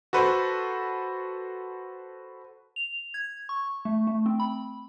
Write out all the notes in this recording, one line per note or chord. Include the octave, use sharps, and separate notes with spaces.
F#4 A4 B4 C5
F7
G#6
C#6
A3
A3
C4
B5